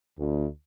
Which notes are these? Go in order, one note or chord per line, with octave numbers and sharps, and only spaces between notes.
D2